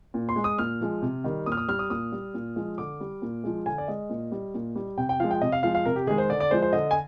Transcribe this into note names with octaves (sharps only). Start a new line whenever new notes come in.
A#2
C6
G#3
D#6
A#2 F6
F3 G#3
C3
D#3 G3
A#2 D#6
F6
D#6
G3 F6
D#6
A#2 D#6
G3
A#2
F3 G#3
D3 D6
G3
A#2
F3 G#3
D3 G#5
D5
G#3 D#5
A#2
G3
A#2
G3
C3 G5
G5
F3 G#3 F5
G5
C3 D#5
F5
F3 G#3 F5
F5
C3 A#4
G4
D#3 G#3 G#4
C5
D3 D5
D5
F3 G#3 C5
C5
D3 D#5
G#5